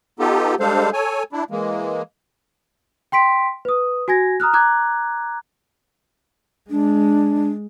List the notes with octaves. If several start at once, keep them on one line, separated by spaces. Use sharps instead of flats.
B3 D#4 F4 G4 A4
G3 G#3 D4 A4 C5 F5
A4 C#5 G#5
D4 E4
E3 G#3 A#3
G5 C6 B6 D7
B4 D#6
F#4 G#5 G#6 A#6
A#5 D#6 F6 F#6
A#5 D6 F#6 G#6
G#3 D4